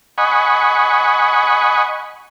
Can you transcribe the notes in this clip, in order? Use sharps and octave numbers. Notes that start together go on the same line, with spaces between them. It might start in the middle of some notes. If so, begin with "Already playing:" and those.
D#5 F#5 G#5 B5 C#6